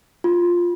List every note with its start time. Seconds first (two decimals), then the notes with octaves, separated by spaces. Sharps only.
0.24 F4